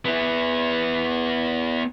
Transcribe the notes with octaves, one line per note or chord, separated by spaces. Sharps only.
B3 E4